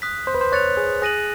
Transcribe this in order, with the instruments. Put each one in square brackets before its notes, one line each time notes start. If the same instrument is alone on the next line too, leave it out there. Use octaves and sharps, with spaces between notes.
[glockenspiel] D#6 F#6 B6
[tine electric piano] C5
B4
C5
[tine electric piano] C#5 [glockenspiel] F#6 A6 C#7 F7
[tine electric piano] G#4
[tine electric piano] G#4 [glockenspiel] F#6 A#6 D#7 F#7